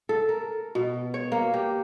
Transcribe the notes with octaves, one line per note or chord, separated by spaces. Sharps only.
A4
A#4
B2
C#5
A#3
G4